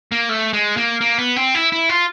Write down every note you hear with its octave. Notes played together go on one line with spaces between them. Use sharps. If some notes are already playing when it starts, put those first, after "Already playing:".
A#3
A3
G#3
A#3
A#3
B3
C4
E4
E4
F4